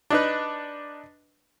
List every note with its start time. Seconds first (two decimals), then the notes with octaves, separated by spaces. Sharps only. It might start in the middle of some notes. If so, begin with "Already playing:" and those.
0.10 D4 D#4 B4